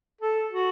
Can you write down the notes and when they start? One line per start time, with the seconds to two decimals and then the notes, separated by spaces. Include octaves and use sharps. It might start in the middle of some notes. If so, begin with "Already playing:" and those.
0.21 A4
0.52 F#4